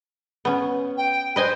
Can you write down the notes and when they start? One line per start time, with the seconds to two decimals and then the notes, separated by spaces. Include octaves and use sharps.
0.45 B3 C#4
0.97 G5
1.36 B4 C5 D#5 G#5